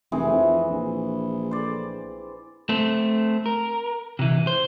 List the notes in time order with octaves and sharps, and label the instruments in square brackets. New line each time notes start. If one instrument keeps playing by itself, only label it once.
[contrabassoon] F1 [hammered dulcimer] E3 C4 G#4
[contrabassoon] F2
A#1
[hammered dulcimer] C5 D5
[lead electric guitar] A3 C4
A#4
C3 E3
C5